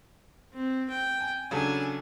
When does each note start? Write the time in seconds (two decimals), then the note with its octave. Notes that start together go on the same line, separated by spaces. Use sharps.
0.53 C4
0.90 G5
1.21 G#5
1.51 C#3 F#3 D4 A4 G#5